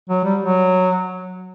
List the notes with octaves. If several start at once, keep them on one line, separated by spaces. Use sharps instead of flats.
F#3
G3
F#3